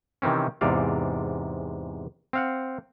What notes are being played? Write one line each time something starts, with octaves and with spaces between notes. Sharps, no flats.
C3 D#3 E3 C4 C#4
E2 G#2 C3 D5 F5
C4 F5 F#5